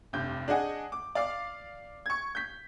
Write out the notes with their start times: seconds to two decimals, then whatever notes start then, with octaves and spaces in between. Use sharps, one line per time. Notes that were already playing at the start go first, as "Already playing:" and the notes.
0.13 F1 G2 G6
0.48 D4 G#4 D#5 F#5 G#5
0.92 D6
1.15 D5 F5 D6
2.06 C#6 G#6
2.35 G6 B6